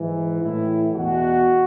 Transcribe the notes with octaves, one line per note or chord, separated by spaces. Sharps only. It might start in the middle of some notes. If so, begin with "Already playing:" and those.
Already playing: G#2 E3
A2 E3 E4
E2 B2 F#4